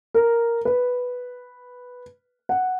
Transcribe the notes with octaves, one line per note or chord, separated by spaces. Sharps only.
A#4
B4
F#5